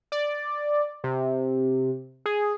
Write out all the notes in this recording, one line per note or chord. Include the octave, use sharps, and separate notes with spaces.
D5
C3
G#4